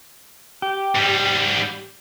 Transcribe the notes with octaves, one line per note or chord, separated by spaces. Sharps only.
G4
G#2 G3